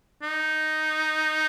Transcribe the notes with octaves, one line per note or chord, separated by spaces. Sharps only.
D#4